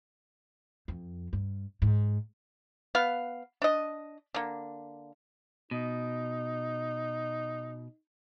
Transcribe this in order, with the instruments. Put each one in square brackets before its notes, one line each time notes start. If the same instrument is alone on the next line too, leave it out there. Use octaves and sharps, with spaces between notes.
[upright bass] F2
G2
G#2
[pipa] B3 F5
D4 D#5
D3 A#3
[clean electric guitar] B2 [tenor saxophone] D#4